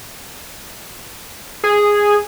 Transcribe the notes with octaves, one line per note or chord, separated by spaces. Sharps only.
G#4